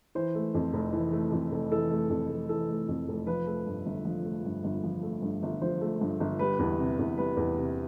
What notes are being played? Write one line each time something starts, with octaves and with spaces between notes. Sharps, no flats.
E3 C5
A3
F2
F1
E3
A3
F2
F1
E3 A4
A3
F2
F1
E3 A4
A3
F2
F1
F3 B4
A3
G2
G1
F3
A3
G2
G1
F3
A3
G2
G1
F3 C5
A3
G2
G1
G3 B4
E2
C3
E2
G3 B4
E2
C3